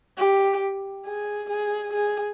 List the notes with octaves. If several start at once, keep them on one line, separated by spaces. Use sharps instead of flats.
G4
G#4
G#4
G#4